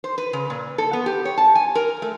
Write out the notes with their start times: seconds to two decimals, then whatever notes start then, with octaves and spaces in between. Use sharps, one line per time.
0.04 C5
0.18 B4
0.33 C#3
0.50 A#2
0.78 A4
0.93 B3
1.06 G4
1.25 C#5
1.38 A5
1.55 G#5
1.75 A#4
2.02 A3